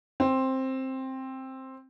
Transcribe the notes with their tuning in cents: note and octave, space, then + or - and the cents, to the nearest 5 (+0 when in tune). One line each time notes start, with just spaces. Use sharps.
C4 +10